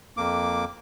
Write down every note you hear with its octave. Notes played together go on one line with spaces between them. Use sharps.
F2 A#3 D6